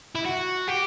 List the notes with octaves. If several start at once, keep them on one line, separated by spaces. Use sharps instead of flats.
E4
F#4
G4